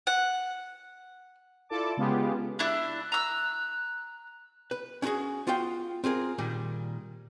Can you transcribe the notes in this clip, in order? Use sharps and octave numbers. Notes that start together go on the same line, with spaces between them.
F#5
E4 F4 A4 D5 A5 D6
C#3 G#3 B3 F4 G4 G#4
D4 E4 F#6
A#5 E6
B4
C#4 D4 F4 F#4 G#4
B3 F4 F#4 F5 G5
C4 F4 G#4 A#4
A#2 D#3 G3